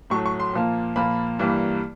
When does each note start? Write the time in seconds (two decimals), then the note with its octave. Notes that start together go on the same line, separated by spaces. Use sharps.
0.10 A2 F#3 A3 C#6
0.26 C#6
0.40 C6
0.53 A#2 F3 A#3
0.96 A#2 F3 A#3 B5
1.39 G2 E3 G3 A#3